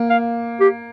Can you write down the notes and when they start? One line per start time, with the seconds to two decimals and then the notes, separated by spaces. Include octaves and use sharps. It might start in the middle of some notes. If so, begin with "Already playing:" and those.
Already playing: A#3
0.10 F5
0.60 G4